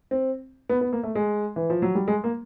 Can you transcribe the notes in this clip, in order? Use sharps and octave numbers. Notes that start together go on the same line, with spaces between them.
C4
B3
B3
A#3
A3
G#3
E3
F3
F#3
G3
G#3
A#3